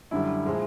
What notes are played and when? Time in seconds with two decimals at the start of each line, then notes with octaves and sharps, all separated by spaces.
0.11 F#2 D3 G3 E4
0.46 A#2 F3 G#3